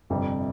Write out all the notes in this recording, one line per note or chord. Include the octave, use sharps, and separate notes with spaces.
G1 F2 C3 G3